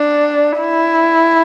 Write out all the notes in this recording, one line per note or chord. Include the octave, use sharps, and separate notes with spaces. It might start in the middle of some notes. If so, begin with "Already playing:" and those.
Already playing: D4
E4